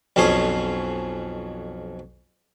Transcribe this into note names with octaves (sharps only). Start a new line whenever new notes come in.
B1 F2 F3 C#4 G#4 C6